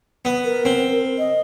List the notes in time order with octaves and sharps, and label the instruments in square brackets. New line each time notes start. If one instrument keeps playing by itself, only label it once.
[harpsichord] B3
[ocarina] A#4
[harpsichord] C4
[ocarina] D#5